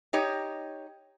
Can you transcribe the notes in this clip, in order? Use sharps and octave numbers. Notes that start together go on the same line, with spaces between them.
D#4 G4 C#5 D#5